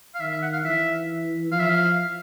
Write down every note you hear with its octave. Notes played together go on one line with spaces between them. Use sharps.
F5
D#3 E5
E5
F#5
F5
E3 E5
F3 F5
E5
F5